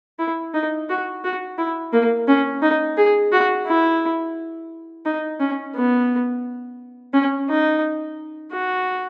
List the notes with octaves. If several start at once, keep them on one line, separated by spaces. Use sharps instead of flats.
E4
D#4
F#4
F#4
E4
A#3
C#4
D#4
G#4
F#4
E4
D#4
C#4
B3
C#4
D#4
F#4